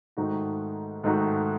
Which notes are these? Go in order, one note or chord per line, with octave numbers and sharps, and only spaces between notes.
G#2 D#3 A3 D#4 F#4
G#2 D#3 A3 D#4 F#4